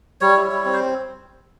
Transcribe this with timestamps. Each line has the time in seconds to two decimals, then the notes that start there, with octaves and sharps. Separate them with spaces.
0.21 G3 C#5
0.37 E4
0.51 G3
0.65 C4
0.73 C5